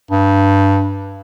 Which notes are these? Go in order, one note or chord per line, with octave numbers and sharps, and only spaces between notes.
G2